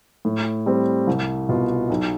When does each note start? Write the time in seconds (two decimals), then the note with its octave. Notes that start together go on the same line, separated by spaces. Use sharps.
0.25 A2
0.66 G3 C4
1.07 C2
1.49 B2 B3 F4
1.90 B1